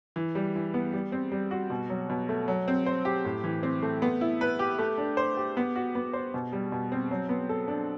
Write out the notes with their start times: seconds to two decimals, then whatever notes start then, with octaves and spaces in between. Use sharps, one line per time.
0.16 E3
0.35 G3
0.56 E3
0.74 B3
0.93 G3
1.12 C4
1.32 G3
1.51 F#4
1.70 B2
1.90 F#3
2.10 B2
2.29 A3
2.48 F#3
2.68 C4
2.86 C5
3.05 G4
3.25 A2
3.44 E3
3.63 C4
3.82 A3
4.02 B3
4.21 E4
4.41 B4
4.59 G4
4.79 A3
4.98 D4
5.17 C5
5.37 G4
5.57 B3
5.76 F#4
5.95 B3
6.13 C5
6.34 B2
6.52 G3
6.72 B2
6.92 C4
7.11 F#3
7.29 B3
7.49 A4
7.68 D4